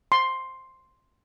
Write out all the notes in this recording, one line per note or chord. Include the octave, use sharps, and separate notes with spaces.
C6